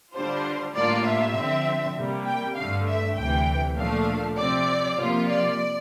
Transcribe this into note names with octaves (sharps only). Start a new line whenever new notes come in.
D3 G3 D4 F4 C5
A2 G3 A#3 D4 F4 D5
E5
D3 F3 C4
C3 G3 A#3
G5
G2 D3 A3 F5
E5
D2 C3 E3 G5
A#2 F3 A3 D4 F5
C3 F3 C4 D5
C3 F3 A#3 F4
D5